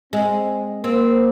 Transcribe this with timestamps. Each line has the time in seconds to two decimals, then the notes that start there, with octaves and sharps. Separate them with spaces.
0.13 G#3 C4
0.84 A#3 C4